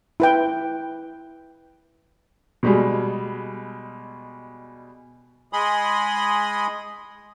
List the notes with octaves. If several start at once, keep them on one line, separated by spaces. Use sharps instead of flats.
E4 B4 G5
B2 G3 G#3
G#3 G#5 B5 C6 D#6